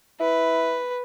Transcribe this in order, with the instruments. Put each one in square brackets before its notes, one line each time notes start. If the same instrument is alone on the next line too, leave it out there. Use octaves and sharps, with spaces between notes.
[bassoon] E4 [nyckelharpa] B4